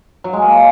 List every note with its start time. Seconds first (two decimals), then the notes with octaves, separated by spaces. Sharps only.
0.24 F#3
0.33 G#3
0.42 A#3